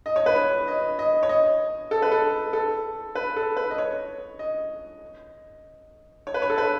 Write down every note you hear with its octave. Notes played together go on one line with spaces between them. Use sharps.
D#5
C#5
B4
C#5
D#5
D#5
C#5
D#5
A4
B4
A4
A4
B4
A4
B4
D#5
C#5
D#5
C#5
B4
C#5
A4
B4